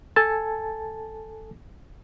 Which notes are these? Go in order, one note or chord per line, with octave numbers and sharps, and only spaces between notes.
A4 G#5 A5